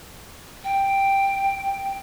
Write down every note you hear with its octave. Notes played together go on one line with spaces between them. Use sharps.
G5